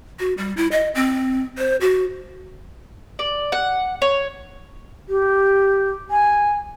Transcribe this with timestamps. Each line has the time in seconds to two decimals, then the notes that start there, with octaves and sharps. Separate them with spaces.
0.19 F#4
0.38 G3
0.57 E4
0.72 D#5
0.95 C4
1.58 C5
1.81 F#4
3.19 D5
3.52 F#5
4.02 C#5
5.09 G4
6.11 G#5